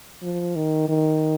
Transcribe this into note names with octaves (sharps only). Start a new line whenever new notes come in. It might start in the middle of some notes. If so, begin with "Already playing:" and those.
F3
D#3
D#3